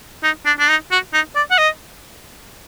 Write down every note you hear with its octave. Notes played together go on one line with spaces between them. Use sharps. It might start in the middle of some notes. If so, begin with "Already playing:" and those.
D#4
D4
D4
D#4
F#4
D#4
D5
F#5
D#5